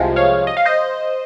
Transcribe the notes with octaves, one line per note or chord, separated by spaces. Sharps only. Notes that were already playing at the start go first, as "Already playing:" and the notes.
Already playing: C2 C3 F3 G#3
C#5 F5
D#5
F5
C5 D#5